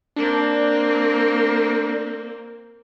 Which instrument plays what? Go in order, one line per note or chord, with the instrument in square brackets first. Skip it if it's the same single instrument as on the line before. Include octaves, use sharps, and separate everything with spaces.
[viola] A#3 C4 [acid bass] D4